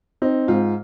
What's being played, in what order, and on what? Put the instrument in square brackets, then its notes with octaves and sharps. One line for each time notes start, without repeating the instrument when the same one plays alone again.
[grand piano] C4 [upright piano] D#4
[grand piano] G#2 [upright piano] F4